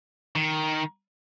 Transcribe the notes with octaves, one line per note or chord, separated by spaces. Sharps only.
D#3